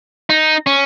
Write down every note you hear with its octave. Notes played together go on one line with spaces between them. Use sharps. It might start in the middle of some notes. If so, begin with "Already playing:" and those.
D#4
C#4